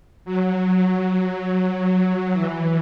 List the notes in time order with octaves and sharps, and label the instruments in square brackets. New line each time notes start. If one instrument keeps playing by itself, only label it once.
[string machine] F#3
E3